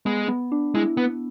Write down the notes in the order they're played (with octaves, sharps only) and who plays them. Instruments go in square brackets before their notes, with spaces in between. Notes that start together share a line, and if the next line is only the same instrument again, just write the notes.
[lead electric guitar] G#3 [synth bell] B3
[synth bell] B3
D4
[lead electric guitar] G#3 [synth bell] E4
[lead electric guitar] B3